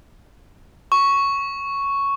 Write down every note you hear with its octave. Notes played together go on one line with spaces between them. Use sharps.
C#6